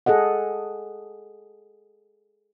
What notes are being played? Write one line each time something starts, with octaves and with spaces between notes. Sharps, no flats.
G#4 A4 D#5 F#5